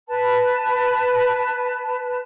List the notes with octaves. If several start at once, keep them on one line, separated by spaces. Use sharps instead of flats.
B4 A5